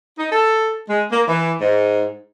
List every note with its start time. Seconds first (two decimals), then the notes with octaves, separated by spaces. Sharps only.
0.19 D#4
0.32 A4
0.90 G#3
1.12 A#3
1.28 E3
1.61 G#2